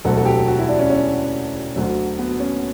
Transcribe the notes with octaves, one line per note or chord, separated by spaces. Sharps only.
E1 D2 D3 F#3 A4
A4
G4
F#4
E4
D4
C#4
C#4
D2 D3 F#3
B3
C#4